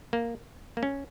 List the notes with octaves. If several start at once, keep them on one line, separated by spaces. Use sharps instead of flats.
A#3
A#3
C#4